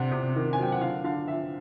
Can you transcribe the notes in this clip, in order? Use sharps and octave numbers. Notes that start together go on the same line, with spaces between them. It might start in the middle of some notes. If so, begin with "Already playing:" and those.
Already playing: C3 D4 F#5
C3
D#3
G#5
F#3 G5
F#5
D3 F5
D3 F5
F3 E5